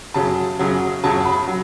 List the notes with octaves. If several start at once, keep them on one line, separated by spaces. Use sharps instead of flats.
F#2 C#3 F#3 A5
F#2 C#3 F#3
F#2 C#3 F#3 A5
B5
F#3